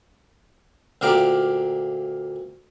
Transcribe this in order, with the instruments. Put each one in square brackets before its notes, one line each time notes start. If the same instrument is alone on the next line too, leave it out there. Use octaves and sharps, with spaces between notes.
[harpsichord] D2 A#2 G4 A#4 D5 D6